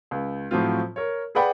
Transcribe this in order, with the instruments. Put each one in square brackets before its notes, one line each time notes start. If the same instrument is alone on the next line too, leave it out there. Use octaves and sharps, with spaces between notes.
[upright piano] C#2
A2 F3 F#3 C4 F4
A#4 C#5
G#4 B4 D5 F#5 G5 B5